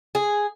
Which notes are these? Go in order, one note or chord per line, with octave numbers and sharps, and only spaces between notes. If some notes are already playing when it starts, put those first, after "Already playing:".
G#4